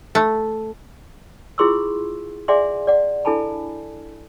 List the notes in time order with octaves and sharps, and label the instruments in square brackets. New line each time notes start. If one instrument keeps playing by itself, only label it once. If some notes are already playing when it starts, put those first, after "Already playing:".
[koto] A3
[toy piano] E4 F4 G#4 C6 C#6 E6
G#4 D5 E5 F#5 G#5 C6
D5 F#5
D4 E4 A4 G#5 A5 B5